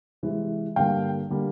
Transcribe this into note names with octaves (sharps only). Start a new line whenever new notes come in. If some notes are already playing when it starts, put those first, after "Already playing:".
C3 E3 G#3
G2 D3 G3 A#3 F5 G5
D3 G3 A#3